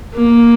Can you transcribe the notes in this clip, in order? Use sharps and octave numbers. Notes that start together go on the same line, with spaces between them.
A#3